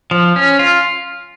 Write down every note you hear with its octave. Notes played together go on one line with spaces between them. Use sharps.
F3
C#4
F4